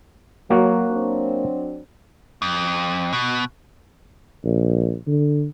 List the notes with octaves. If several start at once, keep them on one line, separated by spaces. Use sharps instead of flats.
F#3 A#3 F#4 F#5
F#3 C4 D4
F2
B2
A#1
D3